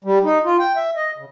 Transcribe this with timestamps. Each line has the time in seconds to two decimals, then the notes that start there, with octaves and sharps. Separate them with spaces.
0.04 G3
0.24 D#4
0.45 F4
0.59 G5
0.76 E5
0.96 D#5
1.18 C#3